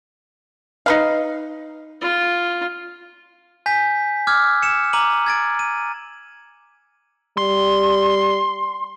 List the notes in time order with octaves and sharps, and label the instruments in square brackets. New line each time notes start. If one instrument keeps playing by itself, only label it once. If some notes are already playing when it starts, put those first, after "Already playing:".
[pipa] D#4 B4 F5
[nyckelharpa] F4
[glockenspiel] G#5 G6 B6
D6 E6 F6 G#6
C#7 E7
A#5 D6 D#7 F#7
G#6 A6 D7
D#7
[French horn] G3 [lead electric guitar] C6